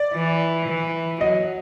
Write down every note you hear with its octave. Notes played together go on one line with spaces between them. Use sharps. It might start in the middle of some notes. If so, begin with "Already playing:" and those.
Already playing: D5
E3
E3
F#3 D#5